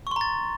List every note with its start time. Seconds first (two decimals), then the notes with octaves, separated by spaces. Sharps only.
0.07 C#6
0.11 C6
0.16 A#5
0.21 A6